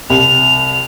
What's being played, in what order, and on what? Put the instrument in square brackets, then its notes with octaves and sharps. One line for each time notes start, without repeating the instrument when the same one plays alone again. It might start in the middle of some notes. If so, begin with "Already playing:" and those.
[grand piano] C2 [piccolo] F7